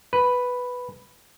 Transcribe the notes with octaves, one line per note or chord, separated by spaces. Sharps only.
B4